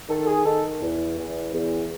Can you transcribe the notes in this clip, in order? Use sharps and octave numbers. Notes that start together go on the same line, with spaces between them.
D#3 A4
G#4
D#3 A4
E2
E2
E2